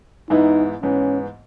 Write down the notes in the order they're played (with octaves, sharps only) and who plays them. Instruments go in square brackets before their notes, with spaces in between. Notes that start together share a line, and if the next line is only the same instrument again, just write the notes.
[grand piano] G#2 E3 B3 E4 [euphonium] D#4
[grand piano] G#2 E3 B3 [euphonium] C#4